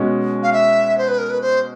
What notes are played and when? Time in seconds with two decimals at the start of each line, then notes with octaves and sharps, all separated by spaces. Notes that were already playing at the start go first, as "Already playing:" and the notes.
Already playing: B2 G#3 C#4 F#4
0.43 F5
0.53 E5
0.98 C5
1.08 B4
1.18 A#4
1.30 B4
1.41 C5